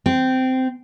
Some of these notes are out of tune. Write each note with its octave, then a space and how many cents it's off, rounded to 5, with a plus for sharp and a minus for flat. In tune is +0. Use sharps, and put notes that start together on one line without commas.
C4 -15